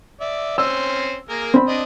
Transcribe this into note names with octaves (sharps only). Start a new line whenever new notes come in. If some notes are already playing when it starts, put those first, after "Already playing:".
D5 E5
C4 C#4 C5 E6
A#3 G#4 A#4
C4 B5
D4 D#5